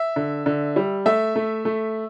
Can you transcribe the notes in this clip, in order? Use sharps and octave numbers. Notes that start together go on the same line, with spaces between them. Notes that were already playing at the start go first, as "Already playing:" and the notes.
Already playing: E5
D3
D3
G3
A3 E5
A3
A3